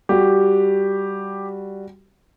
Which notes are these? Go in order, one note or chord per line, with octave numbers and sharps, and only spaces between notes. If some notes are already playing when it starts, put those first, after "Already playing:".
G3 F#4 G4